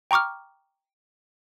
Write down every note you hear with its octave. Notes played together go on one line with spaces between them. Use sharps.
G5 A#5 C#6 D6 F6